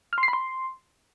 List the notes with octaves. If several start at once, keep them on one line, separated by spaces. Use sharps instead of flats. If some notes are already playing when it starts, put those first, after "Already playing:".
F6
C6
C7
B5
C6